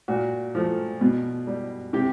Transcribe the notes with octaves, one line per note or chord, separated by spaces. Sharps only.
A#2 F#4
F3 A3
B2
G3
C3 G4